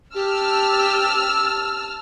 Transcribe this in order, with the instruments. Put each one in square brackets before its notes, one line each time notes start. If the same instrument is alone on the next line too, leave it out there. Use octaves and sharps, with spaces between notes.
[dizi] G4 [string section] A5 E6 F6